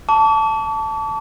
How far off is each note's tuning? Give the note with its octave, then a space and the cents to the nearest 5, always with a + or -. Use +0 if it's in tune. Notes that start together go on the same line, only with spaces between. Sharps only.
A5 +0 D6 -45